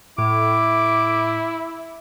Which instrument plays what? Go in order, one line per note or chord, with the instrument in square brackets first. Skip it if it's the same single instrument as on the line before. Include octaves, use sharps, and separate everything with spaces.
[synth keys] A2 [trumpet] E4 [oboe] D6